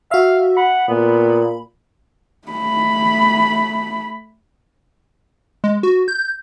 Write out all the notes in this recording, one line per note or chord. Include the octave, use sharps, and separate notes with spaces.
F#4 E5 F5
F#5 B5
A#2 B3
A3 B5
G#3
F#4
G6